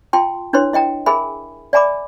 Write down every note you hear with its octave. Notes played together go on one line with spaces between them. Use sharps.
F4 G5 A5 C6
D4 E4 B4 C#5 C6
E4 D#5 G5 A#5
G#4 A#4 E5 G#5 B5
D5 E5 G#5 A#5 B5 D6